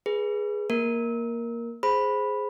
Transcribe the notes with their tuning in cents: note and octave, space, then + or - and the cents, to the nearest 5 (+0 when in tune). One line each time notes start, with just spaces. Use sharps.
G#4 +0 B4 -15
A#3 +5 A#4 +5
G#4 +0 C5 +0 B5 +0